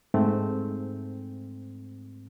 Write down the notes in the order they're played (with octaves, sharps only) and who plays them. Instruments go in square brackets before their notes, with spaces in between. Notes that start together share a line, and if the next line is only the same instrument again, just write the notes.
[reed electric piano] G#2 A3 C4